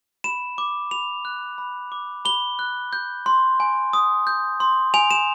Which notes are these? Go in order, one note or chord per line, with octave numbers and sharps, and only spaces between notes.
B5 E7
D6
B5 F7
F#6
B5
D6
B5 G7
F#6
G6
C6
G#5
D#6
G6
C6
G#5 F7
E7